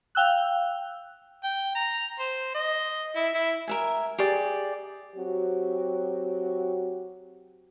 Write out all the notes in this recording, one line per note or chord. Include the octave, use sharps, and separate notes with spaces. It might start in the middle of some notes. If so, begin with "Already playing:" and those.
F5 G5 E6 F#6
G5
A#5
C5
D#5
E4
E4
A#4 E5 G#5
G4 G#4 D5
F#3 C4 F#4 G4